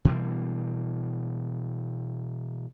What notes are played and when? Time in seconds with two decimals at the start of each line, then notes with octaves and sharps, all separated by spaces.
0.05 B2 E3 G3 A#3